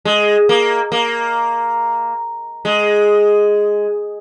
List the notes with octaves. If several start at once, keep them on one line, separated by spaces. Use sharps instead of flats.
G#3
A#3
A#3
G#3